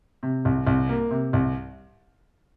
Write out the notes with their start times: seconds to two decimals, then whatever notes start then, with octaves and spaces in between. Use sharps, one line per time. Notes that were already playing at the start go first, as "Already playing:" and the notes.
0.23 C3
0.45 C2
0.67 C2
0.89 A#3
1.11 C3
1.33 C2